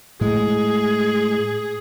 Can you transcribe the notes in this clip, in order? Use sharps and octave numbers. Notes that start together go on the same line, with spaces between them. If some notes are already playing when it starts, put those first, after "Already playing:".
A2 G#3 G#4